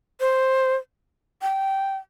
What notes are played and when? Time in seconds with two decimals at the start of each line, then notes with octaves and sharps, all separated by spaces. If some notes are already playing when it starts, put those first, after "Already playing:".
0.20 C5
1.42 G5